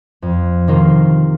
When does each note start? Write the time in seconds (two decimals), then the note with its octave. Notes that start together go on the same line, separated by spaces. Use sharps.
0.22 F2
0.68 C3 D#3 A#3 F4